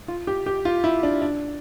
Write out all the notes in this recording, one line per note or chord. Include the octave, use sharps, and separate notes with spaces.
F4
G4
G4
F4
E4
D4
D4